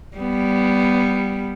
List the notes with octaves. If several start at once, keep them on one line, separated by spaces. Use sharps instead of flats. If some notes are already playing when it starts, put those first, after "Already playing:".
G3 B3